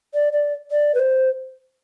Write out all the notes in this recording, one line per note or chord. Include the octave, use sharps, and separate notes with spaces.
D5
D5
D5
B4
C5